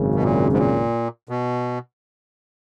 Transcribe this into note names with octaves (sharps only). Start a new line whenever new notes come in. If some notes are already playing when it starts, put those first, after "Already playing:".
Already playing: G#1 F#2 C#3
B2
A#2
G#2
A#2
B2